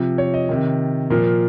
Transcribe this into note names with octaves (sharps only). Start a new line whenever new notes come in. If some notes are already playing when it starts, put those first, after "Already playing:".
Already playing: C3 F3
C#5
D#5
C3 D#3
A#2 F3 A#4